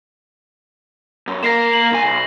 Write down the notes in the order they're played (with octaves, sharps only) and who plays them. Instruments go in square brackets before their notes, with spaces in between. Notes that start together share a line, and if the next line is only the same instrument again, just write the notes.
[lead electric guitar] F#2
[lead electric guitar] A#3 A#4 [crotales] A#6 C7 E7
[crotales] F#7
[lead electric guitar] C2 G#5
B1